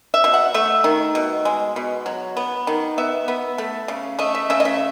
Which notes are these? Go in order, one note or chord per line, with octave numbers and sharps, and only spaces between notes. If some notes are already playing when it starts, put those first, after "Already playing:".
E5
B2
F#5
A3 E5
D#3
B2
G#3
B2
F#3
B3
D#3
B3 E5
B3
A3
C#3
A3 D#5
E5
C#3 E5
D#5
E5